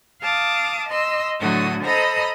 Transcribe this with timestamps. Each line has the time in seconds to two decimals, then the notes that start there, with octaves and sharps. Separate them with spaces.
0.21 F5 A5 D6 D#6
0.89 D#5 C6 E6
1.40 A2 D3 F#3 A3 F#4 D#6
1.84 A4 C5 D#5 A#5 B5 D#6